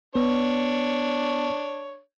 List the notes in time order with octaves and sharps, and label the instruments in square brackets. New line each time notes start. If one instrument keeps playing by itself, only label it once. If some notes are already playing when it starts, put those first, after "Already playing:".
[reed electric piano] B3 [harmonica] D4 C#5